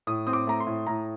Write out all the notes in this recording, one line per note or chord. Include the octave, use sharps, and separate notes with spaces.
A2 D#6
C4 D#6
D6
A3 A#5
C6
A2
A2 A#5